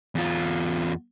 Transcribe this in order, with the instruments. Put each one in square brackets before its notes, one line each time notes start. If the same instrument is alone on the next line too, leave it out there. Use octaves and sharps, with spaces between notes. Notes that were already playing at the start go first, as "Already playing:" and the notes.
[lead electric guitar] E2 F4